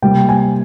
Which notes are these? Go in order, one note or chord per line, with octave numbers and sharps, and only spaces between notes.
C3 G3 A#3 G5
G#5